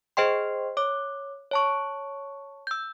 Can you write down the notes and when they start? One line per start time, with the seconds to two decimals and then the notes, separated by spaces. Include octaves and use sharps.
0.17 G#4 C5 D#5 G5 C6
0.77 C#5 D6
1.51 C#5 A5 C#6
2.67 E6 G6